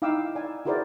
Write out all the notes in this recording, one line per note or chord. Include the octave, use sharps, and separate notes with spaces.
D#4 E4 F5 G5 D6 E6
D5 G#5
E4 F#4 G#4 A#4 C5 D5